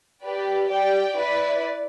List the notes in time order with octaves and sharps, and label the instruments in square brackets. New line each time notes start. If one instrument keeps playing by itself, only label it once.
[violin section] G4 B4 D5
G4 D5 G5
E4 B4 D5